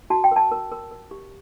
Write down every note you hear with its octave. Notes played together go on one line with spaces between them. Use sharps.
F#4 A5
G5
A#4 A5
A#4
A#4
A#4
G4